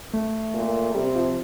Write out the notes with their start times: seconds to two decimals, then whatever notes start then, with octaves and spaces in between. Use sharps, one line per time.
0.13 A3
0.54 A#2
0.94 C3 G3
1.15 F3